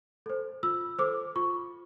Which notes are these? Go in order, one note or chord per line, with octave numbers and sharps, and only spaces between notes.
A4 C5
F4 E6
A4 C5 D6
F4 C#6